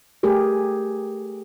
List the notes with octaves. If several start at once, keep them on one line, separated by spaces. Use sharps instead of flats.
A3 G4 G#4 A#4